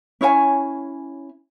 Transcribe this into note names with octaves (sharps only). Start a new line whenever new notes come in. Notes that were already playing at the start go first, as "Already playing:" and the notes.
C#4 E4 C#5 G#5